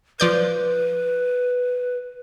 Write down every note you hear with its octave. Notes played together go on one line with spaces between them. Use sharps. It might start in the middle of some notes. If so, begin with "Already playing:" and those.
F3 B4 D5 G6